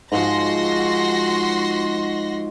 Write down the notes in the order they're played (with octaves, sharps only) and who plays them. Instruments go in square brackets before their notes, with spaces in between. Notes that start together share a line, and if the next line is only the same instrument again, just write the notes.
[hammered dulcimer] G#2 F3 [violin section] F#4 C6 A#6